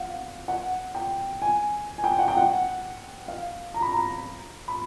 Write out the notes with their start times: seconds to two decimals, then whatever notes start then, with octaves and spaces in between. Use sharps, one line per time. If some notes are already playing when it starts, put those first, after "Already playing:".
Already playing: F5 F#5
0.48 F#5
0.95 G5
1.42 G#5
1.98 G#5
2.04 G5
2.19 F#5
2.28 G5
2.37 F#5
3.28 F5
3.74 A#5
3.82 B5
3.92 A#5
4.68 B5